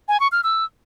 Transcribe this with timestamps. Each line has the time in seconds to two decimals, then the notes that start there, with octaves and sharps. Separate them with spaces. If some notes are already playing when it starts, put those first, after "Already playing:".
0.08 G#5
0.20 C#6
0.32 F6
0.44 E6